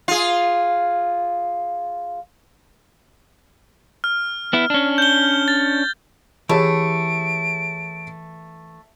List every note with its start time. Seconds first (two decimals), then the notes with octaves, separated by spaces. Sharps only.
0.08 F4 G#4
4.04 F6
4.53 B3 E4
4.70 C#4 D4
4.98 G6 G7
5.48 A6
6.49 E3 A3 G4 G#4 C#5 A5 D7